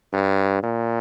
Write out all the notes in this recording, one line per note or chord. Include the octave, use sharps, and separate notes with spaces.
G2
A#2